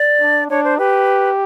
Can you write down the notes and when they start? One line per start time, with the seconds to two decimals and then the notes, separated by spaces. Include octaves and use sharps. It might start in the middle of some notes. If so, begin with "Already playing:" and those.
Already playing: D5
0.21 D4
0.50 D4 C#5
0.64 C5
0.78 G4 B4